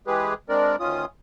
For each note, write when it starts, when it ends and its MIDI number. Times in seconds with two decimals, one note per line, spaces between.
0.07 0.34 52
0.07 0.34 56
0.07 0.34 67
0.07 0.34 68
0.07 0.34 71
0.49 0.76 56
0.49 0.76 60
0.49 0.76 62
0.49 0.76 70
0.49 0.76 74
0.80 1.05 38
0.80 1.05 51
0.80 1.05 61
0.80 1.05 65
0.80 1.05 87